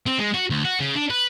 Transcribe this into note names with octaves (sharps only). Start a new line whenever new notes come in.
C4
G#3
F#4
D2
F#4
C#3
D4
B4